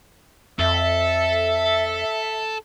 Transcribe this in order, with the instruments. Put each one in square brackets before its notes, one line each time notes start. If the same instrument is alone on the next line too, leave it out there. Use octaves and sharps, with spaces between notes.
[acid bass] F2 [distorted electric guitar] A4 [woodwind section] E5